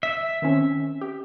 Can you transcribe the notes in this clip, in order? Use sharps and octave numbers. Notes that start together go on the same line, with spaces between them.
E5
D#3 C4 C#4
G4